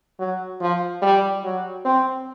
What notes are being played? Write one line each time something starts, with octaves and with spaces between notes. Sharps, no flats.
F#3
F3
G3
F#3
C4